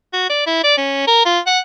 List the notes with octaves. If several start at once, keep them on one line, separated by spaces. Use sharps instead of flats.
F#4
D5
E4
D5
C#4
A#4
F4
F#5